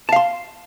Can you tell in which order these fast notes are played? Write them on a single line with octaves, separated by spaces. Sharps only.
A5 F5 C6